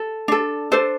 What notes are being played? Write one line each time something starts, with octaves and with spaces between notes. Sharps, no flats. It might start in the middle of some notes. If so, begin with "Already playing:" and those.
Already playing: A4
D4 A4
D4 A4 C5